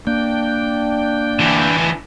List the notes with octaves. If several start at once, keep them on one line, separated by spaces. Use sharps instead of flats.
A#3 D4 G5
D3 E3